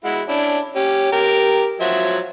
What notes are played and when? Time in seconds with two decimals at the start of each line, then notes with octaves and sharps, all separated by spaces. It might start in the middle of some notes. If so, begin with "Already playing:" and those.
0.04 G#3 E4 F#4
0.28 C#4 D4 E4
0.76 C#4 G4
1.12 G4 A#4
1.80 F3 F#3 E5